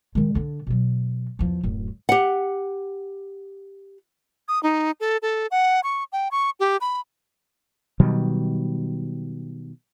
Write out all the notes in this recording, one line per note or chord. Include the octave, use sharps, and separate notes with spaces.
D#3 G#3
D3 D4
B2 F#3
E2 F3
D1 F#2
G4 F#5
D#6
D#4
A4
A4
F#5
C#6
G5
C#6
G4
B5
B2 D#3 F#3 G3